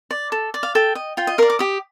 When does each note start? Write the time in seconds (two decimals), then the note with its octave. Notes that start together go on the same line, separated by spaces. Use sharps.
0.11 D5
0.32 A4
0.54 D5
0.63 F5
0.75 A4 G5
0.95 D#5
1.17 F4 G5
1.27 D#5
1.38 A#4 D5 F5
1.50 D6
1.59 G4 D#6